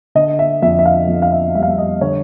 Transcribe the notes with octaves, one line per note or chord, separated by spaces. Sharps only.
D3 D#5
E5
F2 E5
E5
F5
F2
F5
E5
G3 E5
F5
E5
D#5
D3 C#5